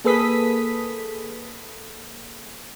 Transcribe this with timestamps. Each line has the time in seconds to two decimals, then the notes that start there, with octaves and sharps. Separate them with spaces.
0.04 A#3 G#4 A4 B4 D#6 B6